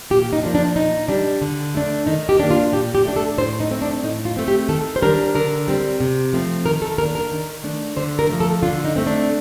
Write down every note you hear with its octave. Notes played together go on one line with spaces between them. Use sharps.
A#2 G4
D#4
F3 A#3 D4
D4
A#2 D#4
G3 D4
D3
A3 D4
D#3 D#4
G4
A#3 D4
F4
A#2 G4
G4
A3 D4
A4
A2 C5
D#4
A3 C4
D4
A2 D#4
F4
A3 C4
G4
D#3 A4
C5
G3 D4 A#4
D3 A#4
G3 C4
C3
F3 A3 C4
D#3 A#4
A4
A#3 D4 A#4
A#4
D#3
A3 D4
D3 C5
A#4
F3 A3
A4
D3 F4
D#4
A3 C4
D4